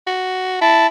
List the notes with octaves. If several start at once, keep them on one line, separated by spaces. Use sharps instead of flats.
F#4
E4 A5